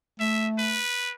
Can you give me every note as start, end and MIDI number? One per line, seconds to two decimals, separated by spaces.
0.20 0.80 57
0.20 0.47 76
0.59 1.13 71